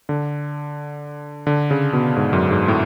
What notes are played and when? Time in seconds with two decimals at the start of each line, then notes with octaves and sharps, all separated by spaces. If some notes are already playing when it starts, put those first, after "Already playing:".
0.09 D3
1.47 D3
1.71 C#3
1.93 B2
2.16 G#2
2.33 F#2
2.51 G#2
2.68 A2